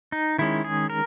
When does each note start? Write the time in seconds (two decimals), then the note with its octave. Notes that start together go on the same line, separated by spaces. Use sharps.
0.12 D#4
0.38 D#3 G#3 C#4 E4
0.64 G#4
0.90 A#4